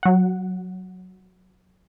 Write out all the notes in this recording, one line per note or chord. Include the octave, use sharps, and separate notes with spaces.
F#3 F#5